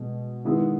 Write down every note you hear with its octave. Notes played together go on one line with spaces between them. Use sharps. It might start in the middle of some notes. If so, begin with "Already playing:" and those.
Already playing: B2 G#3 B3
D#3 G#3 B3 E4 G#4